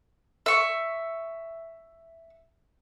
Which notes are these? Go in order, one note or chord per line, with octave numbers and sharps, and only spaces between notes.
E5 C#6